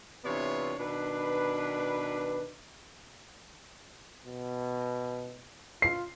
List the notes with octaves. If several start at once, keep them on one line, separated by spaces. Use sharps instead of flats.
C3 E3 B3 D4 F4 C#5
B2 D#3 D4 B4
B2
F4 C7